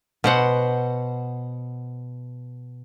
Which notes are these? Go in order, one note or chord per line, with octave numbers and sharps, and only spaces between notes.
B2 C5 F#5